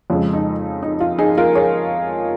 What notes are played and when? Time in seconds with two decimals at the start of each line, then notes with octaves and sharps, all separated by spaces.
0.10 F2 C#3 G#3 F4
0.33 D#4
0.83 D#4
1.00 F4
1.19 D#4 G#4
1.37 F4 A#4
1.55 G#4 C#5